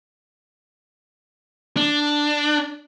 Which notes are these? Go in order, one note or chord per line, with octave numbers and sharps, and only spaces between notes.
D4